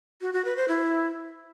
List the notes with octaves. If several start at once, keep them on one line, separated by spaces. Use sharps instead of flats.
F#4
F#4
B4
C5
E4